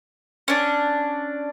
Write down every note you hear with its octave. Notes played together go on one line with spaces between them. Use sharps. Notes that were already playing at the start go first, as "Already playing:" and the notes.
C#4 D4